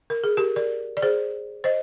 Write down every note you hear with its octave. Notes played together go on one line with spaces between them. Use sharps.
A#4
G#4
G4 A#4
A#4 D5
D5
G#4 C5
C5 D#5